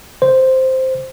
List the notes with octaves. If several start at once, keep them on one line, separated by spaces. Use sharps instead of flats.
C5